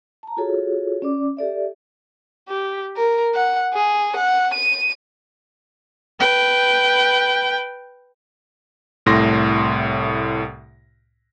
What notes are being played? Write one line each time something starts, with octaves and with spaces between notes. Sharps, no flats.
A5 A#5
F4 F#4 G#4 A4 C#5
C#4 D5 D6
G4 A4 D5 E5
G4
A#4
F#5
G#4
F#5
D#7
B4 G5
C2 A2 C6 A#6